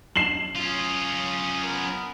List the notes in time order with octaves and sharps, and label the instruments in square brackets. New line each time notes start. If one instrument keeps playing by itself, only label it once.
[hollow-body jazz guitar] F#2 [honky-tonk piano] C7 E7 F#7
[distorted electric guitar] C#4 F4 [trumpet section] D#6
[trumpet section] B3 A#4